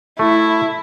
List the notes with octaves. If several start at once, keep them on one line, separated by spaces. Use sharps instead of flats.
A3 E4